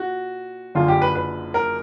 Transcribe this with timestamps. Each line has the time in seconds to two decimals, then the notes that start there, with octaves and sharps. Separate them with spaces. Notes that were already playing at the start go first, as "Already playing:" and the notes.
Already playing: A#2 F#4
0.75 F#1 F#2 D3 F3 F4
0.88 G4
1.02 B4
1.15 B4
1.54 A#4